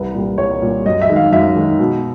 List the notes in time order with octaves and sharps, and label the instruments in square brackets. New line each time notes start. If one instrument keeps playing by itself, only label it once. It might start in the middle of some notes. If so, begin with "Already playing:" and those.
Already playing: [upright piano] C2 B4
A#2 G3
C2 C#5
A#2 G3
F#2 D#5
E5
D#3 G#3
F5
F#2 E5
D#3 G#3
B2